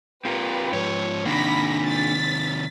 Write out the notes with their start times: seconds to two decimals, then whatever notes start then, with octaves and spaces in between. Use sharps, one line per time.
0.25 C4 F4 G4 A#4 B4
0.73 G#2 F3 C#5
1.26 C3 D#3 A#3 D4 B5 A#6 B6
1.87 A6 B6